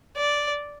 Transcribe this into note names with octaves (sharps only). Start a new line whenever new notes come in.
D5